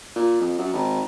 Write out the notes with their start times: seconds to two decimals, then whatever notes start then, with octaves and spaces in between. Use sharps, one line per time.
0.16 A#2
0.41 F2
0.59 F#2
0.73 G#1